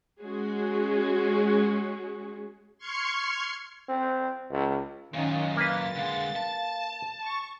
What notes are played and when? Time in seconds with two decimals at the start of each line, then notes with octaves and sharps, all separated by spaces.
0.21 G#3 C#4 F#4 G#4
2.78 C6 C#6 F6 G#6 C7 C#7
3.89 C4
4.51 C#2
5.14 F#2 A#2 D#3 C#4 D#4 F5
5.56 A#3 B4 A6
5.95 D3 G#3
6.36 A5
7.23 C#6